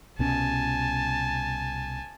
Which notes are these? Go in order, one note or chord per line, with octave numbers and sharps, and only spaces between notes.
C2 B2 C#4 G#5 A5